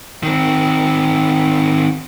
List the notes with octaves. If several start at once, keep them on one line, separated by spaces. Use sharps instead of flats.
D#3 C4